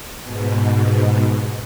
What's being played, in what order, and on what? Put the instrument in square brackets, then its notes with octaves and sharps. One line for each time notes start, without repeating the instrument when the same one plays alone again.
[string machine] G#2 B2